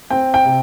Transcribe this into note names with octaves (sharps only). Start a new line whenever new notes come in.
C4 G5
G5
C3